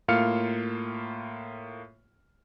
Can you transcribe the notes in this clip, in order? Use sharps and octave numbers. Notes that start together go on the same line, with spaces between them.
A2 A#3 F4 F5 F6 C#7